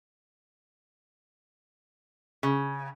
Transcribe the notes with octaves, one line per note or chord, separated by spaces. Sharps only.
C#3